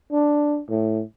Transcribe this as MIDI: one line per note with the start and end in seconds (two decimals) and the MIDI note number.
0.12 0.60 62
0.69 1.03 45